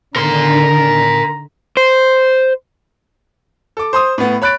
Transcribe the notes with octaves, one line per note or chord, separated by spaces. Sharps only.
D3 D#3 A#4 A#5 C6
C5
A4 D6
C5 C6 D#6
A2 B3
C#5 B5 F#6 A6 D7